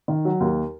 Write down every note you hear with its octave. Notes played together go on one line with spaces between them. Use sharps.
D#3
F#3
D#2